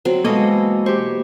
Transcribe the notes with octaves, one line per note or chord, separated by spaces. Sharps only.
F#3 C4
B2 E3 G#3 A#3 F#4 A4 D#5 F5
G4 C5 C#6